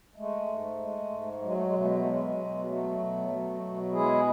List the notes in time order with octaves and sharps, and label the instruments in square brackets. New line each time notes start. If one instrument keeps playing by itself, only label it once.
[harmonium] G#3 A3
G#2
G#3
G#2
F#3 G#3
A3
G#3
B2 A3
G#3
A3
F#3 G#3
B2
F#3 A3
B2
F#3
B2
G#3 E4 G#4